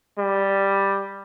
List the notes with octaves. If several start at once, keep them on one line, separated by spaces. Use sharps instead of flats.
G3